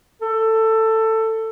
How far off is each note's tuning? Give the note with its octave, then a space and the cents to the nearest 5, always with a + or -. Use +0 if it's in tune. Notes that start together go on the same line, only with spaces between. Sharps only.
A4 +15